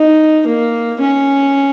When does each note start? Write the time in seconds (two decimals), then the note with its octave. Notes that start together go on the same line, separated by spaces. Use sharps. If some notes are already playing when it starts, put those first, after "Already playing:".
Already playing: D#4
0.47 A#3
1.00 C#4